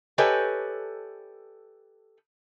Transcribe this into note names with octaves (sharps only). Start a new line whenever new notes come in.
G4 A4 B4 C#5 D#5 G#5